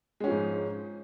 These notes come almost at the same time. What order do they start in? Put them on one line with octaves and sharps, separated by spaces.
G#3 C#4 F3 G#2